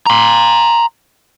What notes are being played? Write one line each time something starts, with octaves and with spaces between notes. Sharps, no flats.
A#5 C6